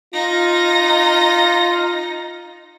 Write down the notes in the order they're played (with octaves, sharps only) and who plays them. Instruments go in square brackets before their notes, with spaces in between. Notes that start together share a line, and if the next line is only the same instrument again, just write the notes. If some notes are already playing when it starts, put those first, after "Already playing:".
[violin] D#4 A#6 [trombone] F4